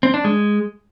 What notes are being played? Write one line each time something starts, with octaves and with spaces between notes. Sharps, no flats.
C4
D4
G#3